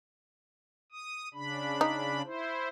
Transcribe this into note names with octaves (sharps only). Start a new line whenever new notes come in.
D#6
C#3 D4 B5
D#4
E4 C5